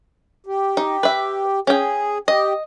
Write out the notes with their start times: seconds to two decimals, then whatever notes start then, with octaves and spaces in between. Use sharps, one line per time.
0.46 G4
0.77 D#4
1.03 B4 E5
1.67 C#4 G#4 G5
2.28 G4 D#5